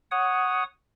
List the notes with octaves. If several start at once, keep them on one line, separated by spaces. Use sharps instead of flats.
C#5 F#5 D#6